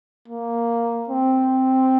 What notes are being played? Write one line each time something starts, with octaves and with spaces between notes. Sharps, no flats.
A#3
C4